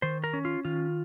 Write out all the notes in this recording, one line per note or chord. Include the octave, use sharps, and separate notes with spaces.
D#3 C5
A#4
C#4
F4
D#3 F4